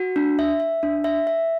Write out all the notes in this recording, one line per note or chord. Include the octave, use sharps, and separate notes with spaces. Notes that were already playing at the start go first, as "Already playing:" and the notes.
Already playing: F#4
D4
E5
E5
D4
E5
E5